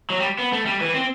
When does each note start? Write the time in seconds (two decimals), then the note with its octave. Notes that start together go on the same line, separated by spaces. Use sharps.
0.10 F#3
0.20 G3
0.38 B3
0.53 A3
0.66 G3
0.81 E3
0.94 C4